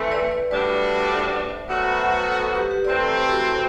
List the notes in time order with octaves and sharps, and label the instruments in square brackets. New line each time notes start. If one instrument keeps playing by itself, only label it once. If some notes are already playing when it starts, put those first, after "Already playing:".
Already playing: [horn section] E3 A3 C4
[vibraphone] B4 D5
B4 D5
[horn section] A2 G3 D4 F#4 [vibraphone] B4 D5
[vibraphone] A4 C5
B4 D5
C5 E5
[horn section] A2 F#3 B3 F#4 [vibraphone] B4 D5
[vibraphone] C5 E5
C5 E5
A4 C5
A4 C5
A4 C5
G4 B4
G4 B4
[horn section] C3 E3 A3 C4 [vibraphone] B4 D5
[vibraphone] A4 C5
G4 B4
F#4 A4